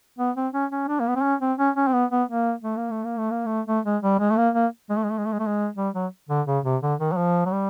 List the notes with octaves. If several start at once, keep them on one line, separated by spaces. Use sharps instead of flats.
B3
C4
C#4
C#4
D4
A#3
B3
C4
C#4
C4
C#4
C#4
C4
B3
B3
A#3
A3
A#3
A3
A#3
A3
A#3
A3
A3
G#3
G3
G#3
A3
A#3
A#3
G#3
A3
G#3
A3
G#3
A3
G#3
A3
G#3
G3
F#3
D3
C#3
C3
D3
D#3
F#3
F3
F#3
G3